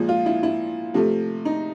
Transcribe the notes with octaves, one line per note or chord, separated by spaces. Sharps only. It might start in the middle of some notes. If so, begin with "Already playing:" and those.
Already playing: A#2 F3 G#3
F4
E4
E4
C3 F3 A3
D#4